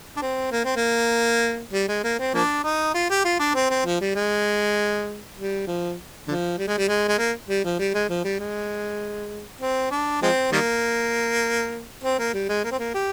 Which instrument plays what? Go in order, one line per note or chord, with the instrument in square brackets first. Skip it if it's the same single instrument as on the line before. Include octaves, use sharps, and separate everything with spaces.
[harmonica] D4
C4
A#3
C4
A#3
G3
G#3
A#3
C4
F3 A#3 D4
D#4
F4
G4
F4
D4
C4
C4
F3
G3
G#3
G3
F3
D3 F3
G3
G#3
G3
G#3
G#3
A#3
G3
F3
G3
G#3
F3
G3
G#3
C4
D4
F3 G#3 C4
D#3 G3 A#3
C4
A#3
G3
G#3
A#3
C4
A#3
G4